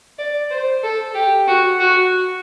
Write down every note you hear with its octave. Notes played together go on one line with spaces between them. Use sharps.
D5
C5
A4
G4
F#4
F#4